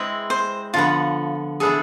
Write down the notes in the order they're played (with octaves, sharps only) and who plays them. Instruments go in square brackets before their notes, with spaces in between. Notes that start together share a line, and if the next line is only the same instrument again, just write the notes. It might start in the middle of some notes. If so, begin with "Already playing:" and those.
Already playing: [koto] G#3 C4 E4 B4
[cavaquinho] C5
[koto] D3 F3 B3 [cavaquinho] F4
[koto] E3 B3 D4 A4 [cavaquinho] G#4